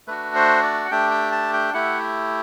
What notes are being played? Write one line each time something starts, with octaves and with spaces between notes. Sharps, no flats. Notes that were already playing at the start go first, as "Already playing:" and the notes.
A3 D4 F#4 B4
C5
D5
F#5
A3 D4 G4 G5
G5
A5
G5
A3 E4 G4 F#5